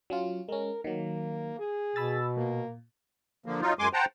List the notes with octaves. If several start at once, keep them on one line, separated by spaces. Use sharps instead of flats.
F#3 C#4 F4
G#3 C#4 A#4
D#3 F#3 A#3
G#4
B2 B5 E6 A6
A#2 A#3
D3 F3 A#3
F#3 D#4 F4
F#2 G#3 G#5 C6 D6
C5 F#5 G5 A5 A#5